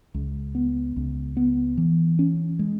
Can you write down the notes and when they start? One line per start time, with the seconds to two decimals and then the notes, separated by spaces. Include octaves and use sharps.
0.14 C#2
0.55 B3
0.96 C#2
1.37 B3
1.78 E3
2.19 C#4
2.59 G#3